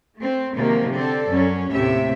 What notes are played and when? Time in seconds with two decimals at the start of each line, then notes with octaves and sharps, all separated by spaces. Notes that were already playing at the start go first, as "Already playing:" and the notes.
0.19 A3 C4
0.55 C3 D#3 F3 F#3 G#3 A#3
0.95 D3 C4 A4 D5
1.29 F#2 F#3 C#4
1.71 D#2 A2 C3 G4 E5